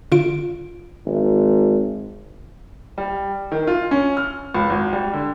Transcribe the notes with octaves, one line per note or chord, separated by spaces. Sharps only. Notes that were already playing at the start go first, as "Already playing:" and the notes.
D3 F4 D7
G#1
G3
D#3
F4
C#4
F6
C#2
G#1
G3
D3